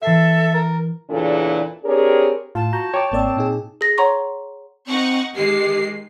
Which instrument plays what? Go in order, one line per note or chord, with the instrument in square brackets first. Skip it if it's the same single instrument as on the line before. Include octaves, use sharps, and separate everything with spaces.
[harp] E3 C7 [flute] A4 [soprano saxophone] E5
[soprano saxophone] A#4
[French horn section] E2 A#2 C#3 E3 D4 A4
C4 D4 G4 G#4 A#4 C#5
[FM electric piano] A2 [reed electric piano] F4 [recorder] A5
[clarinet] F#4 [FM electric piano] A#5 G6
[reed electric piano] C#5 D6 [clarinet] G5
[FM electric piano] G#1 A#3 D5 [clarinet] C4
[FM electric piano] A#2 D#4 G#4
[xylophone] G#4 A#6
C#5 F#5 A#5 C6 C#6
[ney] C4 [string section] D#4 F#5 C#6
[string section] D#3 G#3 C7 [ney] G4